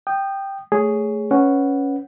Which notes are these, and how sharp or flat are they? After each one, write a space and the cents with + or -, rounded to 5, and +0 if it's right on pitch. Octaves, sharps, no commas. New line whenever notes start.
G5 +0 D#6 -25
A3 +0 G#4 +0 C#5 +10
C#4 +0 B4 +0 F#5 +0